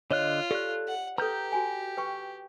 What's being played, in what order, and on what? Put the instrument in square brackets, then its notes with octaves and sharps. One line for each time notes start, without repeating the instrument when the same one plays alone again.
[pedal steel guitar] D3 D#5 F#6 [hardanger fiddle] F4 [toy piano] C#5
[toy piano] G4 D5 F5 [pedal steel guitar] A4 F#6
[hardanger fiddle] F#5
[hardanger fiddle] G4 [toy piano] A4 B4 [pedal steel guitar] A#5 G6
[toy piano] F#4 G#5
B4 G5 C#6